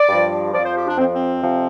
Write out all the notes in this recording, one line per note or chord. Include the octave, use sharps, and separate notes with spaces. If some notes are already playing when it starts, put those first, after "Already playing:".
Already playing: D5
G2 F3
F2 F3 D5
C5
G4
D4
F2 F3 C4
C4
F2 C3 F3